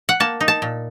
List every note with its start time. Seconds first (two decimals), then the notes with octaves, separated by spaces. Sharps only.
0.09 F#5
0.20 A#3 A5
0.40 D#4
0.48 A5
0.62 A#2